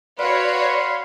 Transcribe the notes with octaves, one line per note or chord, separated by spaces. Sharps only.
F#4 B4 C#5 D5 F5 B5 C6